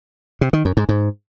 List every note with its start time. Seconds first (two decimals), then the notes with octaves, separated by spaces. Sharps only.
0.41 C3
0.53 D#3
0.65 F#2
0.77 G#2
0.89 G#2